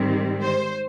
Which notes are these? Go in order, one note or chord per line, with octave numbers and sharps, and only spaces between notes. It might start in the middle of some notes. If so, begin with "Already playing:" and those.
Already playing: G#2 D#3 G3 C4
C5